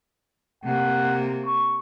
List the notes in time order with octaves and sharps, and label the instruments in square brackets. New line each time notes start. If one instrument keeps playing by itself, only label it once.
[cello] C3 A#3 [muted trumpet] F#5
[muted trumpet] C#6